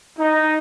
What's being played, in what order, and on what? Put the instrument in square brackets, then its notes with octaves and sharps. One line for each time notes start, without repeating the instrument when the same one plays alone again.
[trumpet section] D#4